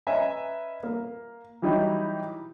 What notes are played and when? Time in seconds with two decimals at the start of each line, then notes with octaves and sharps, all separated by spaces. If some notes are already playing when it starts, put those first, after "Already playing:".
0.07 C#4 B4 D#5 E5 G#5 A#5
0.83 A#3
1.62 E3 F#3 G3 D#4 E4 F#4